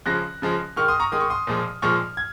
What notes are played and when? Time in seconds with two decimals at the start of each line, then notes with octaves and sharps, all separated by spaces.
0.06 C#3 F3 G#3 F#6 A#6
0.42 C#3 F3 G#3
0.76 D#3 G#3 C#6 F6
0.88 C6 D#6
1.00 A#5 C#6
1.12 D#3 G#3 D#6
1.20 C#6
1.30 C6 D#6
1.47 A#2 F3 G#3
1.82 A#2 F3 G#3 C#6 F6
2.17 G#6